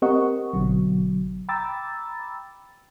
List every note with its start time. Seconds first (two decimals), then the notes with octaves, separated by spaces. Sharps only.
0.02 C4 G4 A#4 D#5 F#5 C#6
0.53 G#1 B2 D3 F#3
1.49 G5 A#5 B5 D6 E6 A6